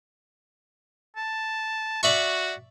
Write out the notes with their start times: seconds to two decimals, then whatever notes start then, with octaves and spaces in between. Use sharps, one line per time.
1.17 A5
2.03 F#4 D5 E5 C#6